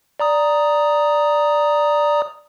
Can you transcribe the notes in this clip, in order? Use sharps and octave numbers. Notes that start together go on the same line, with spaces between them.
D5 A#5 D#6